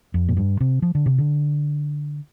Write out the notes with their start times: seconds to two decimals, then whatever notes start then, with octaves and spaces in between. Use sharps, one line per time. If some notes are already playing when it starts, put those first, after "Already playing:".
0.14 F2
0.29 A#2
0.37 G2
0.60 C3
0.82 F3
0.95 D3
1.06 C3
1.18 D3